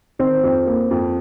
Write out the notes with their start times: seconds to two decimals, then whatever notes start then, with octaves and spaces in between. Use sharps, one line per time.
0.19 D#3 C4
0.44 F2
0.67 A#3
0.91 F2